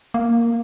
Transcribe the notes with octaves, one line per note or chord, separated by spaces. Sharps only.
A#3